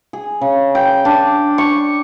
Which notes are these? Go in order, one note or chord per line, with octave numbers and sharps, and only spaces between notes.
G#4
C#3
G5
D4
C#6